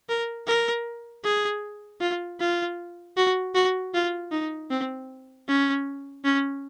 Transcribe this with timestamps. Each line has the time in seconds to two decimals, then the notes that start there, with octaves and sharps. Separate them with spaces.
0.09 A#4
0.47 A#4
1.24 G#4
2.01 F4
2.40 F4
3.17 F#4
3.55 F#4
3.94 F4
4.32 D#4
4.70 C4
5.48 C#4
6.25 C#4